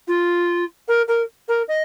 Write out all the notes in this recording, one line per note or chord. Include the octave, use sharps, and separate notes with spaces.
F4
A#4
A#4
A#4
D#5